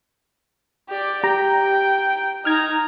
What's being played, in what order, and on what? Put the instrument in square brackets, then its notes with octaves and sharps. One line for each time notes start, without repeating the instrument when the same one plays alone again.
[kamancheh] G4 D5
[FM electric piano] G4 A#5 [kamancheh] G5
[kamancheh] D#4 A#5 [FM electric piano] F6 G#6